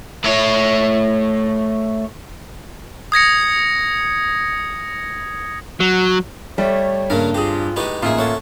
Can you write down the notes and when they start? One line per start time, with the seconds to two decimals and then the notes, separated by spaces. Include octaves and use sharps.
0.24 A3 C#5
3.12 D#6 G#6 A#6 C#7
5.80 F#3
6.58 G3 A3 C#5
7.10 G2 C#3 A#3 F5
7.34 C4 F4 G4 G#4
7.76 A2 G#3 D#4 G4 B4
8.02 A1 A#3 D#4 F4 G#4 E5
8.17 A4 C#5 F#5